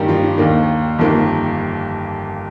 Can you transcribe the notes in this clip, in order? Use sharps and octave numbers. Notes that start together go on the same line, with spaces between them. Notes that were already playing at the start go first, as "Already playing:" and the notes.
Already playing: G2 D#3 G3 A#3 G4 A#4
F3 F4
D4
D#2 D#3 A#3
G1 F2 D#3 A#3